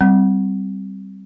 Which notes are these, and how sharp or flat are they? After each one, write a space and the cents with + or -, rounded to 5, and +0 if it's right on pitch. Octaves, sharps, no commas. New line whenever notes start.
G3 -10 C4 +0